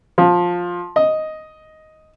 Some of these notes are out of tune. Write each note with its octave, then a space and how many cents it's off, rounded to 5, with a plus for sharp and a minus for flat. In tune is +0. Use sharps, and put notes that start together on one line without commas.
F3 +15
D#5 +5